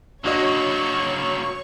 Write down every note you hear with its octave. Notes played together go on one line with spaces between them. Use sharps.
F#3 A#3 D4 F#4 C#5 D#5 C#6